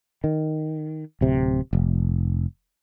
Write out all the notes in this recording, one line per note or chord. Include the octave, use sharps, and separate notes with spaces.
D#3
D1 C3
F1